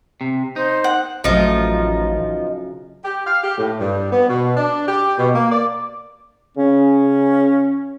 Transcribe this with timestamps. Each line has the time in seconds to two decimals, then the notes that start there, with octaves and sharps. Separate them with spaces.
0.21 C3
0.56 D#4 C5
0.84 F#5
1.24 A1 C#3 F3 F#3 A3 D#4
3.05 G4
3.27 F5
3.44 G4
3.58 A2
3.80 G2
4.12 B3
4.29 B2
4.57 D4
4.88 G4
5.18 B2
5.35 A#3
5.52 D5
6.57 C#3 C#4